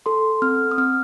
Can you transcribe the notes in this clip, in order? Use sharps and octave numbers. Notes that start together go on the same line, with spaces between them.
A4 C6
C4 F6
D#6
C4 F6